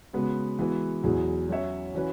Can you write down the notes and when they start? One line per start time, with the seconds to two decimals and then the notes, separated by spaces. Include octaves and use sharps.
0.13 C#3 G#3 B3 F#4 B4
0.59 E3 G#3 B3 F#4 B4
1.04 E2 B2 F#3 E4 G#4
1.49 F#3 C#4 F#4 C#5 E5
1.94 E3 C#4 F#4 B4